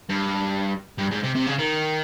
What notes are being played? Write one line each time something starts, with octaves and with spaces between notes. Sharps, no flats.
G2
G2
G#2
C3
C3
C#3
D#3